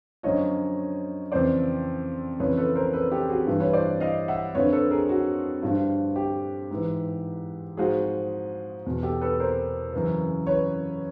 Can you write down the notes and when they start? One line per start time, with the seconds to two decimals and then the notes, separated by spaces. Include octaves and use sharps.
0.23 F#2 D3 F3 C#5 D#5
1.32 F2 C#3 E3 C5 D5
2.40 F2 C#3 E3 B4 C#5
2.57 A4 B4
2.76 A#4 C5
2.93 A4 B4
3.11 G4 A4
3.29 F#4 G#4
3.47 G2 E3
3.60 B4 C#5
3.73 C5 D5
4.00 D#5 F5
4.28 E5 F#5
4.55 F2 D3 F3 B4 C#5
4.73 A4 B4
4.91 G#4 A#4
5.09 F#4
5.63 G2 D3 F3
6.16 G4
6.71 G#2 E3
7.77 G#2 F3 F#4 G#4
8.86 E2 B2
9.03 G4 A4
9.21 A4 B4
9.40 A#4 C5
9.93 F#2 C#3 E3
10.47 B4 C#5